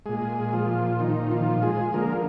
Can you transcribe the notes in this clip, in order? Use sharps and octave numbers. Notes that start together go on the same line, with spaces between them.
A#2 G#3 G#4
F3 F4
D#3 D#4
F3 F4
G#3 G#4
D3 F3 A#3 A#4